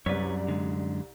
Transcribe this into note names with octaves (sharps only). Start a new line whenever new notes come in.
C2 F#2 B4 C#5 D5 B6
D3 G#3